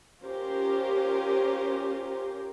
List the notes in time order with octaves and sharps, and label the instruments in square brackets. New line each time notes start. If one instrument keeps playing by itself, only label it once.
[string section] C#4 F4 G4 A#4 C5